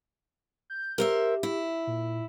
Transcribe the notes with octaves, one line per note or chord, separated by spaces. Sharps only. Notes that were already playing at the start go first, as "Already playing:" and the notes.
G6
G4 A#4 C5 E5
E4
A#2